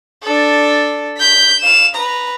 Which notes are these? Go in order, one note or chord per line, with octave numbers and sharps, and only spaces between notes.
D4 A4
G6 B6
F5 E7
B4 A#5